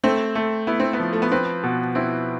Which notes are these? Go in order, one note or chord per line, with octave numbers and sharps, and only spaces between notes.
A3 C4
A3
B3 E4
C4
B3
F3
A3
B3
C4 B4
B2
C4 E4